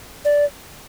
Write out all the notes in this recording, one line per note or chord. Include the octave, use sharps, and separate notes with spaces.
D5